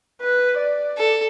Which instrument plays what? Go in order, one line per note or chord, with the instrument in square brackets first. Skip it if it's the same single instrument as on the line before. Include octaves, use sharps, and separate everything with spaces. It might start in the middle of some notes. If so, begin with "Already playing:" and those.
[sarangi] B4
D5
[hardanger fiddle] A4